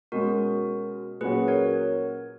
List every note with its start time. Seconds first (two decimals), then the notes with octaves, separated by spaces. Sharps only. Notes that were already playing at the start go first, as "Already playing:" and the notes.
0.12 B2 G#3 C#4 F#4 A#4
1.21 A#2 F#3 C#4 F#4 G#4 B4
1.48 A#4 C#5